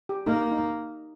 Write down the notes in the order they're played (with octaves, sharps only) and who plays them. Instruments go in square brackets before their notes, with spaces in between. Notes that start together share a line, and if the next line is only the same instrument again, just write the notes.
[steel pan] G4
[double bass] A#3 [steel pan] D#4
[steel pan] D#4